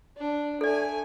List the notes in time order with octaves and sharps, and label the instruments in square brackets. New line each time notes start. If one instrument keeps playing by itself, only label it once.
[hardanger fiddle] D4
[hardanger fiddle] A3 G#5 [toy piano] A4 D5